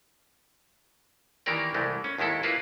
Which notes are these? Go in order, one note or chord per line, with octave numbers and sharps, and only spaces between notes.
D#3 E3 A#3 G4 A#4 D5
C2 E3 G#3 A3
C#4
D#2 D#3 G#3 E4 A4
A#3 E4 F4 G#4 B4